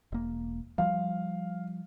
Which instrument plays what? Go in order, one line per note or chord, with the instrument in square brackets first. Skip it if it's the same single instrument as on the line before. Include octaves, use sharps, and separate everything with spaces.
[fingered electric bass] E1 A#3
[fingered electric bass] F3 G3 [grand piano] F5